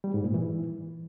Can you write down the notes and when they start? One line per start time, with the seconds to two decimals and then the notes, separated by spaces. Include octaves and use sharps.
0.04 G3
0.14 G#2
0.24 A#2
0.34 E3